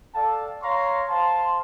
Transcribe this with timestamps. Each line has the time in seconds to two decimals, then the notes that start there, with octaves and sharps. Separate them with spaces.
0.15 A4 D5 F5 G5 A5
0.62 C#5 F5 A#5 C6 C#6
1.08 C5 F5 A5 C6